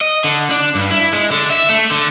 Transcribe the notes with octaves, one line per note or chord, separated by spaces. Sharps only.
D#5
D3
D4
G2
E4
G#3
D3
E5
A3
D3